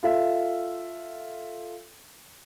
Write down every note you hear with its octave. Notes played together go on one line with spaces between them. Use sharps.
F4 A4 E5